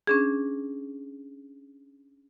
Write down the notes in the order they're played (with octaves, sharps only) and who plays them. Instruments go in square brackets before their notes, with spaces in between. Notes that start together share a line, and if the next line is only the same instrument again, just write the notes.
[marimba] C#4 D4 G#4